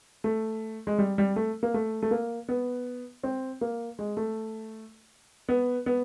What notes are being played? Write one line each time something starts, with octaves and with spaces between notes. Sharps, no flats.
A3
G#3
G3
G3
A3
A#3
A3
A3
A#3
B3
C4
A#3
G#3
A3
B3
B3